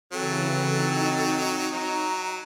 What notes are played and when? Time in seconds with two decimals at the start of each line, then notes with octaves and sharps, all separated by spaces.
0.13 C#3 E3 F#3 C4 A4
0.71 D#4 A4
1.73 F#3 A#5